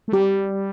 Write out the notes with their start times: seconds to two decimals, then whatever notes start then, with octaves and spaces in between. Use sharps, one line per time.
0.08 A3
0.13 G3 G4